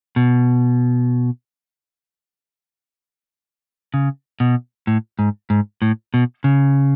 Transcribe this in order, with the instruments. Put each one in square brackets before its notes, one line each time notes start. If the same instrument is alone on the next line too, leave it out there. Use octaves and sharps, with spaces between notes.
[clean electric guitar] B2
C#3
B2
A2
G#2
G#2
A2
B2
C#3